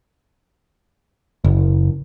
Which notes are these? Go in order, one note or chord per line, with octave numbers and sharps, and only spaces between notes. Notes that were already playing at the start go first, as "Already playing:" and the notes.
F#1